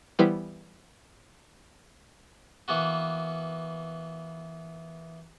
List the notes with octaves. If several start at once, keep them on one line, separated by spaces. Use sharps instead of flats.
E3 G3 B3 E4 G4 C5
E3 A#3 B3 F#4